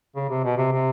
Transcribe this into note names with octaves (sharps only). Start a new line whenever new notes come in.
C#3
C3
B2
C3
C3